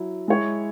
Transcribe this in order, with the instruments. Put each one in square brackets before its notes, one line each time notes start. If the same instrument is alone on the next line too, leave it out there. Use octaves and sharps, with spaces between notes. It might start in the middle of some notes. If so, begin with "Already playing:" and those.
Already playing: [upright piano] F#3 E4
G#3 E4 C#5